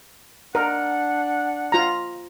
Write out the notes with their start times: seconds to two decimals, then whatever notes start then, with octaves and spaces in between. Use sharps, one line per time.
0.55 D4 A#4 F#5
1.72 F4 A#5